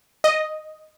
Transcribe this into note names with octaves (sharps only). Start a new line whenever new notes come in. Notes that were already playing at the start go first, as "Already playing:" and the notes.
D#5